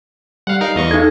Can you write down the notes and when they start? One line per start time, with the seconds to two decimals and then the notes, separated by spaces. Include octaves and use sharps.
0.47 G3 F5 F#5
0.61 D#4 A#4 F5
0.75 E2 D#5 C#6
0.91 D#4 A4 F5 G#6